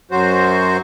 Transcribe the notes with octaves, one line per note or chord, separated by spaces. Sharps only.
F#2 F#3 F#4 C5